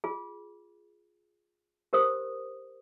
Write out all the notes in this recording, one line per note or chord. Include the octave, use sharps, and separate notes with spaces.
F4 G#4
G4 A#4 C5 D#6